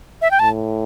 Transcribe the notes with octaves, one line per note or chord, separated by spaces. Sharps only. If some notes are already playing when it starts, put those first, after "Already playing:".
E5
G5
A2 A5